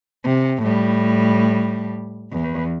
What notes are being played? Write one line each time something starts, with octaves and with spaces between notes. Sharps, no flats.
C3
A2 G3
E2